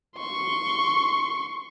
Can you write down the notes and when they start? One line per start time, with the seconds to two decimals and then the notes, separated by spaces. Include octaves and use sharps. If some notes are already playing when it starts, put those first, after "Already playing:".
0.17 C6 C#6